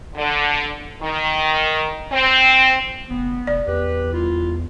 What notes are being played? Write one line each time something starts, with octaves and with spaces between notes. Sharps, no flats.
D3
D#3
C4
F1 B3
F1 D5
E2 G4 B4
C2 E4 F4